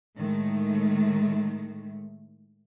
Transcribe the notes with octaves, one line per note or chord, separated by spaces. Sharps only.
A2 D#3 G#3 A3